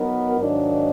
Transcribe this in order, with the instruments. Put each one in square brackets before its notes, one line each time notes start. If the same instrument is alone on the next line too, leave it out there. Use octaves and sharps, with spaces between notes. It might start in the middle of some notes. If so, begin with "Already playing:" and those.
Already playing: [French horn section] F#3 B3 D#4 F#4 A#4
G#2 D#3 F#3 A#3 D4